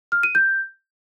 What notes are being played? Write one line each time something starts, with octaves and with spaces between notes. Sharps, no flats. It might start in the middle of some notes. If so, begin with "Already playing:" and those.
F6
D#7
G6